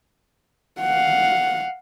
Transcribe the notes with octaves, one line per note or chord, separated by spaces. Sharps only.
F5 F#5